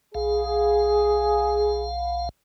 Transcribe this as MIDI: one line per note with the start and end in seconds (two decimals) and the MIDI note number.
0.15 2.29 35
0.15 1.87 68
0.15 2.29 77